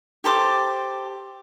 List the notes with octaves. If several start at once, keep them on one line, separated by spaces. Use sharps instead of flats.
G4 A4 C5 D6